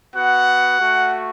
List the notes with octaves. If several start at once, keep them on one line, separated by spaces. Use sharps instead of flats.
B3 F#4 F#5
A3 F#4